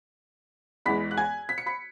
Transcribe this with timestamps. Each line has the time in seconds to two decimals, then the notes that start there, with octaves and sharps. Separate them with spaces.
0.86 E2 E3 G#3 B5 B6
1.11 F#6
1.17 G#5 G#6
1.49 B6
1.58 C#7
1.66 B5 B6